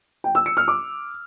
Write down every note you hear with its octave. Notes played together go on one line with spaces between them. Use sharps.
G5
E6
C#7
F6
D6